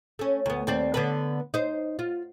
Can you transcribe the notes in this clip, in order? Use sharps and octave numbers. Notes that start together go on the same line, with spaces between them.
A3 C#4
D2 B3
D#2 C4 D5
D3 B3 B4
D#4 C5
F4